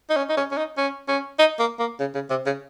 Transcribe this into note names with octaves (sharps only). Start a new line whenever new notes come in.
D#4
C#4
D#4
C#4
C#4
D#4
C#4
C#4
D#4
A#3
A#3
C#3
C#3
C3
C#3